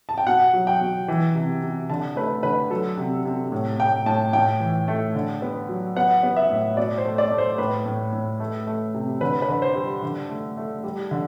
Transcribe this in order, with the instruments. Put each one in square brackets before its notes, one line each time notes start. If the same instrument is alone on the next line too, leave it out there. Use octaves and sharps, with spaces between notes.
[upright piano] A5
G5
B2 F#5
F#3
G5
B2
E3
C3
C3
D3 A5
A3 B4
D3 B4
F#3 A4
C3
C3
A2
A2 G5
A2 A5
A2 G5
E3
A3
D3
B3
F#3
B3 F#5
B3
E5
A2
B2 D5
C5
A3
D5
A3
C5
A2 B4
A2
A2
A3
A3
C3
D3 B4
B4
D3
C5
G3
D3
A3
A3
G3
D3